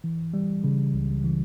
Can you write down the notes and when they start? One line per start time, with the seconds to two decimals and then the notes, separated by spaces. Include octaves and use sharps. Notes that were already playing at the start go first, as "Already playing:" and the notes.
0.04 E3
0.34 G3
0.64 C#3
0.94 C#2
1.24 E3